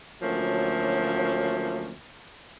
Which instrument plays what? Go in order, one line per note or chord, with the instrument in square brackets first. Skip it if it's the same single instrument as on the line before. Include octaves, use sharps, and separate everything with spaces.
[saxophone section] D2 F3 F#3 A3 A#3 C#4